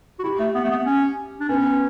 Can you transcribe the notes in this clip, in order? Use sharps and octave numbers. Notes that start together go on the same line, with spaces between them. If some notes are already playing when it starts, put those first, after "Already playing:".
F#4
E4 G4
A3
B3
A3
B3
C#4
D4
B3 C#4